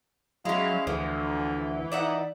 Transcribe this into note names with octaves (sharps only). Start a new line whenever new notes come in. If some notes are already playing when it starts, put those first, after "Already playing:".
F#3 G#3 C#4 E4 F5
D2 D3 E3 F3
D#4 D5 E5 F#5